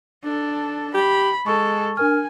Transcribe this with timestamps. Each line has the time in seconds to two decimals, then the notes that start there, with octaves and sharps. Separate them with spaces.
0.24 D4 A4
0.94 G4 B5
1.46 G#3 A4 C#6
1.97 D4 A#4 G#5 F6